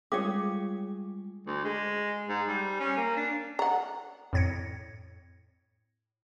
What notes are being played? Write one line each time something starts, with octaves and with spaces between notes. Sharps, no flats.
G3 G#3 C#4 F4 G#4 C#5 F5 D6
D2
G#3
G#2
G3
C#4
A#3
D4
F#5 A#5
F2 A2 G#6 A#6 C#7